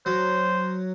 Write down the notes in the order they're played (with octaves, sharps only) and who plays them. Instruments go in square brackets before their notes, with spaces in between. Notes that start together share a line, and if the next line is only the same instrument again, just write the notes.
[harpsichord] F#3 [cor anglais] C5